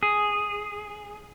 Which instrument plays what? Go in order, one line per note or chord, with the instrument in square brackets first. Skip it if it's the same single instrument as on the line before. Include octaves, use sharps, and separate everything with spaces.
[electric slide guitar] G#4